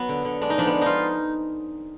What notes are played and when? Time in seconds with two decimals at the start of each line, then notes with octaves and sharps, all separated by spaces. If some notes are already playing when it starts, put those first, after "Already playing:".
Already playing: F#3 B3 F#4
0.09 D3
0.25 D3
0.41 G#3 D4
0.50 D#4
0.58 F3 D4
0.67 B3
0.75 F3
0.81 D#4 F4